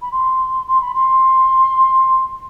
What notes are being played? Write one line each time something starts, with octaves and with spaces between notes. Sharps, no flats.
B5
C6
C6
B5
C6